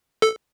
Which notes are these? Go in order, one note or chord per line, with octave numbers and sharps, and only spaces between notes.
A4